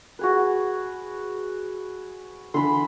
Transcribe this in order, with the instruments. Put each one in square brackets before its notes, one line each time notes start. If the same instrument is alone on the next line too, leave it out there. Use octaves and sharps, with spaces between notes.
[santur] F#4 G#4 B4
[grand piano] D3 E3 [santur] B5 C6